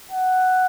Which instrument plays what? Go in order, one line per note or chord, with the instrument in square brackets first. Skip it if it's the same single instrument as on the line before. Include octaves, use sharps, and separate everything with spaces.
[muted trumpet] F#5